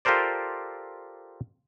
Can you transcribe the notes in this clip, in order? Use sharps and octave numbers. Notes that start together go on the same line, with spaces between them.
F4 G4 A4 A#4 C5 D5